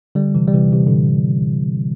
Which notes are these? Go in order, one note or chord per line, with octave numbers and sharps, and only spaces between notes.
D3 G3
C3 E3
G3
C3 E3
C3 E3
A2 D3